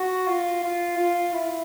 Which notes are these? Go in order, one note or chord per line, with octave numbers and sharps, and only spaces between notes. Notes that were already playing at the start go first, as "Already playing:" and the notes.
Already playing: F#4
F4
F4
F4
E4